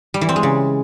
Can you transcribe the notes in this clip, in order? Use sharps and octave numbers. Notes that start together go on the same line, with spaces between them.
G3
E3
C4
G#3
C#3